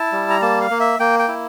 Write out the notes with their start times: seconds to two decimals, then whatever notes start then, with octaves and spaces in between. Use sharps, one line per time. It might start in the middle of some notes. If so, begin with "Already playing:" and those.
Already playing: E4 A5
0.12 G3
0.30 A#5
0.42 A#3 A5
0.61 F5
0.70 A#3
0.80 E5
1.00 A#3 G5
1.19 G5
1.28 E4